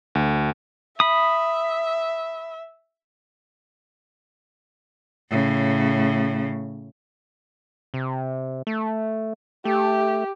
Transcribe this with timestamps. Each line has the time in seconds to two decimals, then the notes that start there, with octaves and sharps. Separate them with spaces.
0.15 D2
1.00 E5 B5 D#6
5.30 A2 C#3
7.94 C3
8.67 A3
9.65 A3 G4